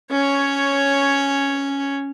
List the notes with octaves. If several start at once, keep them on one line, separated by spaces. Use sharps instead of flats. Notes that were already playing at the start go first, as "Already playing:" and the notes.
C#4 C#5